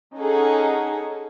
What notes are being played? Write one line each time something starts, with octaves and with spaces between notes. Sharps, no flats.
C#4 D#4 G#4 A4 F#5